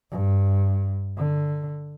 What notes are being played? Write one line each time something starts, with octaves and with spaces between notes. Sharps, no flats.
G2
D3